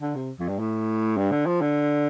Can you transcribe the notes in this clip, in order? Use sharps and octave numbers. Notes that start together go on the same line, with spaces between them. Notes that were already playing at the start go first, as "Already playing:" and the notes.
D3
C3
F2
G2
A2
G2
D3
F3
D3